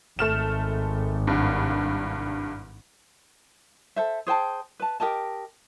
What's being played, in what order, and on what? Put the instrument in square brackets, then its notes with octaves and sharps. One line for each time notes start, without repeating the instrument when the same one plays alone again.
[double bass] G#1 [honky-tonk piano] A3 F6 E7
[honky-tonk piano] C2 G2
[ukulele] A4 C5 E5
G#4 C5 G5 A5
B4 A5
G4 A#4 D#5 A5